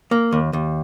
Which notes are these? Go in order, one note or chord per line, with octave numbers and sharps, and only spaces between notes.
A#3
D#2
D#2